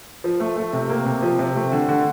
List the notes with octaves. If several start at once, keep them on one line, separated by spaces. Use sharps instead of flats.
F3
A3
A3
C3
A#3
C3
F3
C3
A3
D3
D3